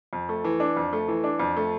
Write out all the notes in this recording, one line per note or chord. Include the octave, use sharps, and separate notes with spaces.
F2
A3
E3
D4
F2
A3
E3
D4
F2
A3